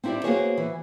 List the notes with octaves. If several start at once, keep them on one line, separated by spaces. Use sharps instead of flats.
C4 D#4 E4 G4 D5
A#3 B3 F#4 G#4 C5 C#5
E3